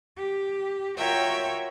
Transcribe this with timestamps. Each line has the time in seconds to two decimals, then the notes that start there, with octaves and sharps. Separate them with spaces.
0.16 G4
0.98 F4 F#4 A#4 C#5 E5 G5